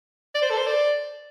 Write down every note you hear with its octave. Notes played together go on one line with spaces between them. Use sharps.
D5
C5
A4
C5
D5